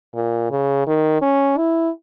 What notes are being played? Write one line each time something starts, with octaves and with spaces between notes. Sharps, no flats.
A#2
C#3
D#3
C#4
E4